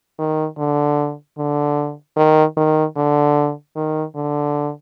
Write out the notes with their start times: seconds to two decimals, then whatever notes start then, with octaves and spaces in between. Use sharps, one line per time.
0.19 D#3
0.58 D3
1.38 D3
2.17 D#3
2.57 D#3
2.97 D3
3.76 D#3
4.16 D3